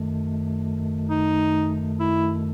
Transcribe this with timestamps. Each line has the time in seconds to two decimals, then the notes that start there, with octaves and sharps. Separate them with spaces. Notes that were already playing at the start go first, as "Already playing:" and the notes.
Already playing: F#2 D#3 A3
1.10 D#4
2.00 E4